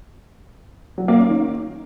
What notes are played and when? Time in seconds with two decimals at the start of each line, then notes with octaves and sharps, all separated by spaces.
0.98 F#3
1.08 A#3
1.19 C#4
1.29 D#3